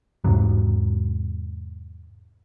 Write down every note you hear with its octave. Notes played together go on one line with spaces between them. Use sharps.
E2 G#2 C3 F#3